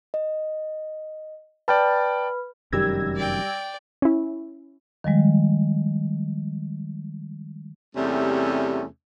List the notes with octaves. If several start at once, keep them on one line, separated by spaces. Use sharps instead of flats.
D#5
B4 D5 G5 A5 B5 F6
F1 F#2 D#3 G3 G4 E6 G#6 A#6
D5 G5
C#4 E4
D#3 F3 G3 G#3
E2 C3 G3 A3 C#4